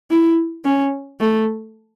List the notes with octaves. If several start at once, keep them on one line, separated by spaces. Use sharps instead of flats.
E4
C#4
A3